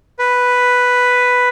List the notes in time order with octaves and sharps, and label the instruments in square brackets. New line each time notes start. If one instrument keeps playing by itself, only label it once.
[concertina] B4